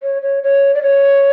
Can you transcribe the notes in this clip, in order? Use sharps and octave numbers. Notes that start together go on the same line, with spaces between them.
C#5
C#5
C#5
D5
C#5